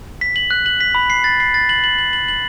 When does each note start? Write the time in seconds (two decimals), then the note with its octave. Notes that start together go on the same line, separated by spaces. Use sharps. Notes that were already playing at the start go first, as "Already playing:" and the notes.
0.21 B6
0.36 F#7
0.51 F#6
0.66 F#7
0.81 B6
0.95 B5
1.10 C7
1.24 A6
1.40 C7
1.54 A6
1.69 F#7
1.84 F#7
1.98 F#7
2.13 F#7
2.28 F#7